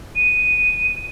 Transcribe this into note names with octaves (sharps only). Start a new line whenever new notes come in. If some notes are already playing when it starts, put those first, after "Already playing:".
D#7